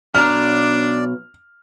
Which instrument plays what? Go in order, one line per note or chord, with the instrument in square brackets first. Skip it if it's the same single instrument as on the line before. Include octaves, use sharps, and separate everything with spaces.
[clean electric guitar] B1 B2 A#5 [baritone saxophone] D4 [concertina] D5 [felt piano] F6